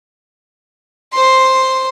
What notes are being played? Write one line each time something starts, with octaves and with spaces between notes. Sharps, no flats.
C5 C6